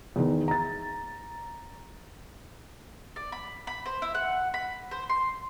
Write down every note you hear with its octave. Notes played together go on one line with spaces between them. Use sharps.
E2 D#3
A#5 A6
D5
B5
B5
C5
E4
F#5
B5
C5
C6